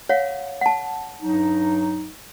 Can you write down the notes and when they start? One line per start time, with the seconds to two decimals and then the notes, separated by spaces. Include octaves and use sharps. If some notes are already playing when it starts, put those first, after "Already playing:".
0.09 C#5 F5 F#5
0.61 F#5 A5
1.22 G2 F#3 D#4